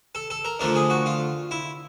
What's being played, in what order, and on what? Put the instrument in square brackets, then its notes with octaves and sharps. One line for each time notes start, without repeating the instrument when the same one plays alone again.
[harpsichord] A4
A4
A#4
D3 F3 A3 D4 A#4
G#4
F#4
F4
E4